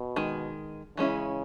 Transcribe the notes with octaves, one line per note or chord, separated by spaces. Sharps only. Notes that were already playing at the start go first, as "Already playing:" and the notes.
Already playing: B2
D#3 G#3
C#3 E3 G#3 C#4 E4